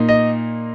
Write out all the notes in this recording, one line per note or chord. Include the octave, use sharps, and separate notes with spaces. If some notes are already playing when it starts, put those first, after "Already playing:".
Already playing: A#2 A#3 D#4
D#5